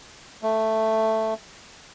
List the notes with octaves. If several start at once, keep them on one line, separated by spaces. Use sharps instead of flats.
A3